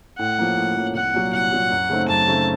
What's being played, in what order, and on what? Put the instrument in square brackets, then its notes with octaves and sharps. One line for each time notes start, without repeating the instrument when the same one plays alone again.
[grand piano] A2 [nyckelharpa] F#5
[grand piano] F3 A#3 C#4
A2
F3 A#3 C#4
[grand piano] C2 [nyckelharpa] F#5
[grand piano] A#2 F#3
[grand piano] C2 [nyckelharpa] F#5
[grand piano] A#2 F#3
F#2
C#3 A3 C4 D#4
[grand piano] F#2 [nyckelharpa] A5
[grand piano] C#3 A3 C4 D#4